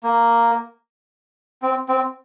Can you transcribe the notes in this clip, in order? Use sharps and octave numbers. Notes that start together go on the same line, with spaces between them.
A#3
C4
C4